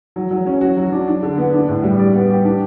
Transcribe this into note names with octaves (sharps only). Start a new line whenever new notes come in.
F#3
F#3
C#4
F#4
F#3
D4
D4
D3
B3
D4
A2
G3
D5
B3
G4
D4